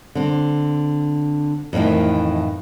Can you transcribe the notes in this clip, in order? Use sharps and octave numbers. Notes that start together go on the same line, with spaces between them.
D3 C4
F2 A2 C3 D#3 E3